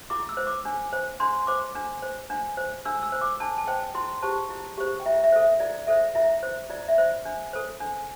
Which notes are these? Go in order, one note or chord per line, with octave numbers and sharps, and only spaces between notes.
E4 D6
E6
C5
D6
D4
C5
D4 C6
C5 D6
D4
C5
D4
C5
D4 E6
E6
C5
D6
D4 A5
A5
C5 G5
E4 C6
G4 C5 A5
E4
G4 C5
G5
E4 E5
E5
A4 C5
E5
E4 D5
A4 C5 E5
E4 E5
C5
E4 D5
E5
C5
D4
A4 C5
D4